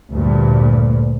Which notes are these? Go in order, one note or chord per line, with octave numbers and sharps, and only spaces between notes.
D2 G2 A#2